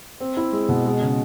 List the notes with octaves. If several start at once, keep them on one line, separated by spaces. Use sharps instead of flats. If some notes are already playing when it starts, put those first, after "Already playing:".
C4
E4
G#3
B2
G#3
C#3